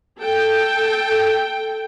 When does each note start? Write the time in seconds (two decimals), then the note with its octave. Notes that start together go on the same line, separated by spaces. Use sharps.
0.17 A4 G5